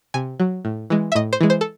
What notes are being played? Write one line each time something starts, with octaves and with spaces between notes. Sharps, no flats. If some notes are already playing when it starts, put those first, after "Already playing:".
C3 G#5
F#3
A2
E3 G#3
E5
A2 D#5
C5
E3 G#3
C5
A4